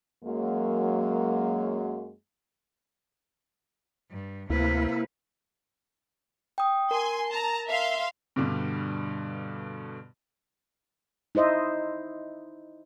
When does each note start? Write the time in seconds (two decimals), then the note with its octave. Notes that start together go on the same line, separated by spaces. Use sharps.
0.24 F#2 F#3 G#3 A#3
4.11 G2
4.50 D2 C3 A#3 E4 B4
6.58 G5 D#6
6.91 A#4 G#5 C6
7.31 A5 A#5
7.68 E5 F5 C6
8.36 G2 B2 D3 G3
11.35 D#4 E4 C5 D#5 E5